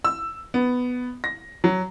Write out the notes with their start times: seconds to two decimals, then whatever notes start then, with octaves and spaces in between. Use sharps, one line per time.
0.04 E6
0.54 B3
1.24 A#6
1.64 F#3